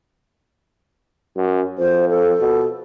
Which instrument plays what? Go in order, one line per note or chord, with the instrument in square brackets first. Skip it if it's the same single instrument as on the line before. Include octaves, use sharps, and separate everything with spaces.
[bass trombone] F#2
[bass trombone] F2 [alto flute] C5
[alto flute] A4
[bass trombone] B2